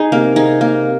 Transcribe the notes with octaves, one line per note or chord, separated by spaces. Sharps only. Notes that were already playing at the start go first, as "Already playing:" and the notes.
Already playing: D#4 G#4
C3 A#3
D#4 G#4
A#3